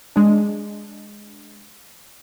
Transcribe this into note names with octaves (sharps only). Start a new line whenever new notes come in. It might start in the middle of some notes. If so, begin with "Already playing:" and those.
G#3 D4